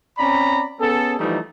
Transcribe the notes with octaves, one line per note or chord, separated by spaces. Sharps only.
C4 C#4 D5 A#5 B5
B3 C#4 G#4 A4
E3 F3 G3 A3 D#4